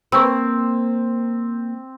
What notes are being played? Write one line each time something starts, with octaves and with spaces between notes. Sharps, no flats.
A#3 C4 A#4 B4 C#6 E6